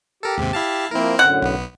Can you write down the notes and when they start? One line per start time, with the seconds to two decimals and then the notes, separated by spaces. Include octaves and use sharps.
0.23 G4 A4 A#4
0.38 D#2 G#2 C3
0.53 E4 F5 A5
0.91 F3 A#3 C4 E4 A#4
1.19 F#2 A2 D3 F#5
1.42 B1 B3